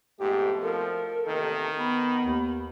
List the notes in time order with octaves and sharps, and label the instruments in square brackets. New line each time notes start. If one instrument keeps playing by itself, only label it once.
[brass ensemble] F2 B2 A3 [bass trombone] G#2 [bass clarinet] G4
[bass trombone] F3 [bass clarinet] A4 [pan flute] A#4
[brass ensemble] A1 D#2 C3 [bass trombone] D#3
[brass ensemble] B3 [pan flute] B5
[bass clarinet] D#2